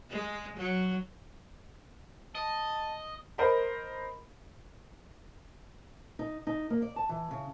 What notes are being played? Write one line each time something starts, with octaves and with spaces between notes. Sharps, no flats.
G#3
F#3
D#5 A5
A#4 C5 D#5 A#5 B5
D#4
D#4
A#3
D5
A5
E3
C#3